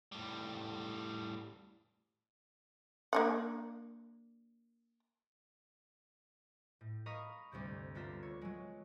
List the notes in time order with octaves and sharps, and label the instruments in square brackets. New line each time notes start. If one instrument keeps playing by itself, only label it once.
[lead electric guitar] A2 G3
[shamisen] A#3 D4 F#5
[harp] A2
A#4 D#5 F5 B5 C#6 D#6
D2 G2 C3 C4
A3 B3 D4 F4 A#4 E5
C#5
F#3 G#3